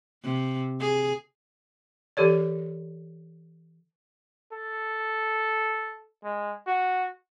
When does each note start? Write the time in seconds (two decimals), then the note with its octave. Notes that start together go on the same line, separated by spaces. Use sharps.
0.23 C3
0.80 G#4
2.17 E3 G4 A4 C#5 D5
4.53 A4
6.24 G#3
6.67 F#4